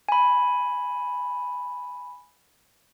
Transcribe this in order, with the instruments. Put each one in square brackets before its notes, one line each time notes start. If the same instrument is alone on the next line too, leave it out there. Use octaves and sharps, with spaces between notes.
[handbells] G#5 B5